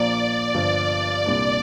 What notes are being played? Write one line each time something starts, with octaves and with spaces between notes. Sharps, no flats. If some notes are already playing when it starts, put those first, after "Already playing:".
Already playing: A#1 A#2 F3 A#3 D5
G1 G2 F3 D5
C2 A#2 G3 D4